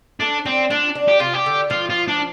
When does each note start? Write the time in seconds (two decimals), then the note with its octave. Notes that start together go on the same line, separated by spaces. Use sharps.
0.20 A3 D4
0.45 C4 D4
0.70 D4 F4
0.95 D4
1.08 G4
1.20 C3 F4
1.33 G4
1.46 D3
1.70 F3 F4
1.90 F4
2.08 D4